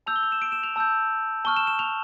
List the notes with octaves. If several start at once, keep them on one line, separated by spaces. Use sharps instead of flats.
A5 E6 G6 F7
G7
F7
E7
D7
E7
F7
A5 E6 G6
A5 C#6 F6 G7
E7
E7
F7